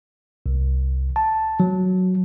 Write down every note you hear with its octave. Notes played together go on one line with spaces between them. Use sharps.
C2
A5
F#3